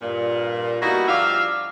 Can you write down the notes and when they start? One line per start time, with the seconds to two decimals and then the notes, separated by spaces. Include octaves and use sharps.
0.02 G2 A#2
0.82 G3 A#3 B3 D#4 E4 F#4
1.08 G2 F3 D5 E5 F5